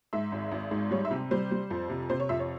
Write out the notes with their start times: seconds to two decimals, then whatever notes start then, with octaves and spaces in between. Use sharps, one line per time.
0.13 G#2 E5
0.32 G#1
0.51 G#1
0.71 G#2
0.91 G3 C#5
1.05 E5
1.11 C3
1.31 G3 C5
1.51 G3
1.71 F2
1.90 C3
2.10 C3 C5
2.20 C#5
2.29 F2 E5
2.39 C#5